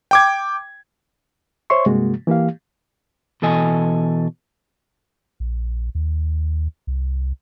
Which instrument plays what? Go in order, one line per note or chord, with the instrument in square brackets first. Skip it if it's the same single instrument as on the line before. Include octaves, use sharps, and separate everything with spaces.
[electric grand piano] G5 D6 G#6
[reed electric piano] C5 C#5 E5 C6 C#6
G2 C3 G#3 A#3 F#4
E3 A#3 G4 F5
[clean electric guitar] B2 E3 A4 D#5 G#5
[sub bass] A#1
D#2
C2